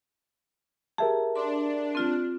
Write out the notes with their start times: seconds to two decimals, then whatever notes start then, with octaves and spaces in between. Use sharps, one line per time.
0.98 G4 G#4 A#4 E5 A5
1.36 D4 C6
1.95 C4 F4